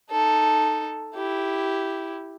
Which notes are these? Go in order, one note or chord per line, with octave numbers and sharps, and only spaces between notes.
D#4 A4
E4 G4